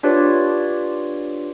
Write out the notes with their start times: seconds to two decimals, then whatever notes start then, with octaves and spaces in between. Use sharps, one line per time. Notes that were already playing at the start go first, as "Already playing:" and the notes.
0.03 D4 F4 G4 B4 C#5 D5